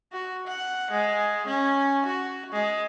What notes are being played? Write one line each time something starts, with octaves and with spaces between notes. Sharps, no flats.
F#4
F#5
G#3
C#4
F#4
G#3